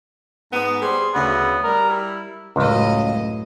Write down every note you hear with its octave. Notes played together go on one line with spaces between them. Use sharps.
G#2 B3
G3 G#4 C5
D2 C#3 B3
G3 A#4
E4
C#2 F#2 A2 D#5